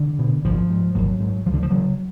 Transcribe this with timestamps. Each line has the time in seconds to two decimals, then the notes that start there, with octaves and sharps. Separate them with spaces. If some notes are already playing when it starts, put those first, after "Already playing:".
Already playing: D3
0.19 B2
0.44 G#1 F3
0.70 G#2
0.95 G#1 F#3
1.20 G#2
1.46 D2 F3
1.54 D3
1.63 F3
1.71 C#3 F#3